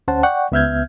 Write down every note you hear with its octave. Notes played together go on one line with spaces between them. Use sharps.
D2 C#4 C5 F#5 A5
D5 F#5 G5 C#6
C#2 B3 E5 F6 G6 G#6